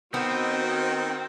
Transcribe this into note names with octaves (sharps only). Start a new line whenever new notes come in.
D#3 B3 C4 F#4 D#5